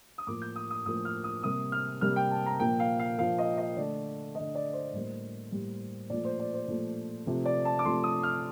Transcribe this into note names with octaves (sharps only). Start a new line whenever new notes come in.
D#6
A2 F3 A#3 D6
G6
D#6
D#6
A2 F3 A#3 D#6
F6
D#6
C3 G3 A#3 D#6
F6
C3 G3 A#3 F6
G5
A5
A#5
A#2 F3 A#3 G5
F5
F5
A#2 F3 A#3 F5
D#5
D#5
D3 A3 D5
D3 A3 D#5
D5
C5
A2 G3 A#3
A2 G3 A#3
A#2 F3 A3 D5
C5
D5
C5
A#2 F3 A3
C3 F3 A3
D5
A5
D6
C3 F3 A3 C6
D#6
F6